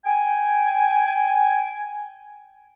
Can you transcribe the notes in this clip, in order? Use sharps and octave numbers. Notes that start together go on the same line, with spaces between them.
G5 G#5